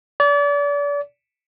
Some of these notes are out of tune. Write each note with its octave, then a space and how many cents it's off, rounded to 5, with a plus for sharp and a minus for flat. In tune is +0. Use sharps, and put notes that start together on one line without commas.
D5 -35